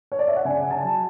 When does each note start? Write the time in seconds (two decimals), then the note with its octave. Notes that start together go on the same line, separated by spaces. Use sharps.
0.12 C#5
0.19 D5
0.28 E5
0.36 F#5
0.45 C#3 G#5
0.71 A5
0.83 F#3